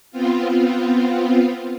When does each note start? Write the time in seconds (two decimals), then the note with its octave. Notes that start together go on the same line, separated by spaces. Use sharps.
0.11 B3 C4 F4